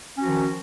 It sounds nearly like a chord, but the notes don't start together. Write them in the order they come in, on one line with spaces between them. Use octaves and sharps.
C#4 F#4 F3 D#3